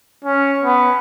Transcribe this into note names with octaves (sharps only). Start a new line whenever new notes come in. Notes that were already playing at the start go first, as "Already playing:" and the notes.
C#4
B3